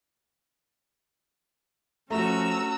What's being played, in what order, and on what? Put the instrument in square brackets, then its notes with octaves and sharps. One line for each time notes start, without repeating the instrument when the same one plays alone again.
[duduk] F3 [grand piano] A3 [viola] C#4 F#4 [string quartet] A#5 E6